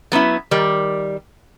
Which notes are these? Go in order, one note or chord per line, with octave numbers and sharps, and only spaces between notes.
F#3 B3 C#4 E4
D#3 G3 A#4